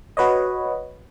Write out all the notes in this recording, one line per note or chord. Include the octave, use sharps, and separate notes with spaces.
F#4 B4 C#5 D#5